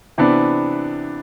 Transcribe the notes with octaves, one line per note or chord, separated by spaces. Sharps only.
C3 E3 B3 D4